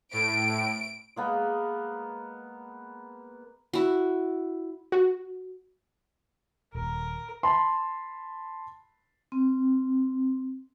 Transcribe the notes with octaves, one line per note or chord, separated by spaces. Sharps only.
A2 D7
G#3 A#3 B3
E4 F#4
F#4
D#1 A#4
A5 B5 C6
C4